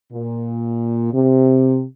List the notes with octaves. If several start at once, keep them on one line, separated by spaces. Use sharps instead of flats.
A#2
C3